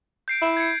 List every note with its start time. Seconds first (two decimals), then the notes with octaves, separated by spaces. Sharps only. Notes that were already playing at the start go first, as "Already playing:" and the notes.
0.28 G6 C7 D7
0.42 E4
0.57 G#6 C#7